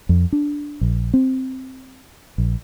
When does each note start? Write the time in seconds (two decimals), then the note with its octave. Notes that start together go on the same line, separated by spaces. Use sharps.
0.09 F2
0.32 D4
0.81 A#1
1.14 C4
2.38 A#1